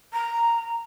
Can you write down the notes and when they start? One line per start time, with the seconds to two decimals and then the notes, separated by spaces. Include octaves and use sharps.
0.13 A#5